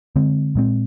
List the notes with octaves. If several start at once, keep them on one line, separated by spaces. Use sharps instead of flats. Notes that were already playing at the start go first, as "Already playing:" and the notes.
D3 G#3 C4
A#2 G#3 C4